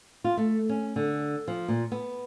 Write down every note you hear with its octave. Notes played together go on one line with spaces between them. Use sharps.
F4
A3
C#4
D3
F3
A#2
B3